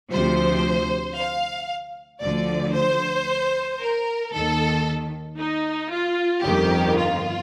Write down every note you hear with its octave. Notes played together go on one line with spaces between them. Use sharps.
D2 C3 F3 C5
F5
D2 D3 F3 D5
C5
A#4
D#2 D#3 A4
D#4
F4
G1 F2 D#3 G4
F4